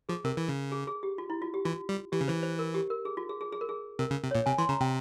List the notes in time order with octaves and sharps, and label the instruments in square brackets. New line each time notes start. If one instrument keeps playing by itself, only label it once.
[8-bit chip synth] F3 [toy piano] G#4
[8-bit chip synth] C3 [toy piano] A#4
[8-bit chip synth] E3
C#3
[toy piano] G#4
G#4
G4
F4
E4
F4
G4
[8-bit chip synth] E3 [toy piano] F4
[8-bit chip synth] G3
[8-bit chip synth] E3 [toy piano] G4
[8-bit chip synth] C#3
[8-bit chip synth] E3 [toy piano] C5
[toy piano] C5
A#4
G4
A#4
G#4
F4
G#4
G#4
G#4
A#4
G#4
[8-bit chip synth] C3 [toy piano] A#4
[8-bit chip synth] C#3
C3
[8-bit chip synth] A#2 [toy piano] C#5
[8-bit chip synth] C3 [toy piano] G#5
[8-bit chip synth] E3 [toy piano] C6
[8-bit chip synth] C#3 [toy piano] A#5
[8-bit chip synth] C3 [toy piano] G5